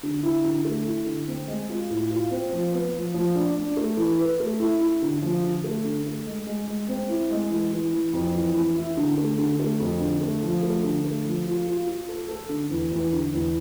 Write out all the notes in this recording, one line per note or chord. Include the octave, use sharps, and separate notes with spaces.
D3
E4
D3
A3
E4
D3
C4
G#3
F4
A2
F4
C4
F3
B3
F3
F3
D4
D4
A3
E3
B4
A3
E4
E4
D3
F3
D3
A3
D3
A3
G#3
G#3
G#3
C4
E4
G#3
E3
E3
E3
F2
E3
E3
E4
D3
A3
D3
A3
F2
D3
A3
F3
A3
D3
A3
F3
F4
F4
F4
A4
A4
D3
E2
E2
D3
E2